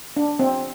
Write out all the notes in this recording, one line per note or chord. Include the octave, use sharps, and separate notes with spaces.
D4
C4